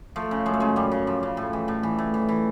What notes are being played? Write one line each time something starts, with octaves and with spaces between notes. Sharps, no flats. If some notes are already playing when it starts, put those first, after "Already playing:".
F3 A3
C#3
F#2 G#3
A3
C#3 G#3
F#2 G3
C#3
F3
C#3
A2
E3
A2
E3
A2
E3
E3